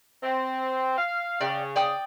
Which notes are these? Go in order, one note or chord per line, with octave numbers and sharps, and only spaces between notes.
C4
F5
C#3 D5 G5
D5 G5 D#6